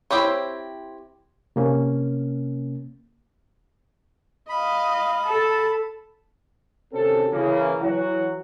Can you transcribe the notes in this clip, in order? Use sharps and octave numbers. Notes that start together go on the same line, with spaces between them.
C4 E4 G4 C5 C#5
C3 A#3 C#4
D#5 F5 B5
A4 A5
D#2 C3 C4 C#4 F#4 A4
C#3 E3 A#3
E3 F#3 F#4